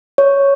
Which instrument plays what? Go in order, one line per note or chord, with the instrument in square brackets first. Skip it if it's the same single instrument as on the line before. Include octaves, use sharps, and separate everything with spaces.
[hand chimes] C#5